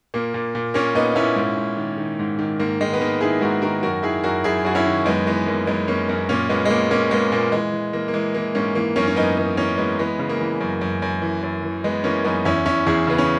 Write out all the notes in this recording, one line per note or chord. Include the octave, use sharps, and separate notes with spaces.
A#2 A#3
A#2
A#2
A#2 A#3 C#4
A#2 B3 D#4
D#4
A#2 C#4 E4
G#2
G#2
D#3
D#3
G#2
D#3
G#2 A#3
D#3 G#3
B3
D#3 A#3
D#3 E4 G#4
G#2 F#4 A#4
D#3 F#4 A#4
F#2 F#4 A#4
D#3 E4 G#4
F#2 F#4 A#4
F#2 E4 G#4
F#2 F#4
C#4 E4
D#3
F#2 G#3 B3
E3 G#3 B3
F#2 A#3
F#2 G#3 B3
F#2 A#3 C#4
F#2 A#3 C#4
A#2 A#3 C#4
A#2 G#3 B3
G#3
A#2 A#3
A#2 A#3 C#4
A#2 G#3 B3
A#2 A#3
E3 G#3
E3
E3 A#3
A#3
E3 G#3
E3 A#3
G#2 A#3 C#4
E3 A#3
F#2 A#3 C#4
C#4
F#2 B3 D#4
E3 B3 D#4
E3 A#3 C#4
E3 G#3 B3
E3 G#3 B3
C#3
A#3
E3
F#2
F#2
F#2
E3
F#2
E3
E3 G#3 B3
E3 A#3 C#4
F#2 B3 D#4
E2 C#4 E4
E2 C#4 E4
E2 E4 G#4
C#3 B3
C#4